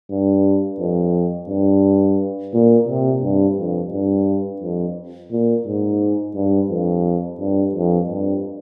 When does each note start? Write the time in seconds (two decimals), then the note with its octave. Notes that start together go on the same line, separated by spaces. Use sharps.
0.11 G2
0.80 F2
1.49 G2
2.54 A#2
2.88 C3
3.23 G2
3.58 F2
3.92 G2
4.62 F2
5.31 A#2
5.66 G#2
6.36 G2
6.70 F2
7.40 G2
7.75 F2
8.09 G2